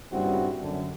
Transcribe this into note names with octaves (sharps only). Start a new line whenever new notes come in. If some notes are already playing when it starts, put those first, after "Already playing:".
G2 A#2 C#3 C4 E4 F#4
F#2 D3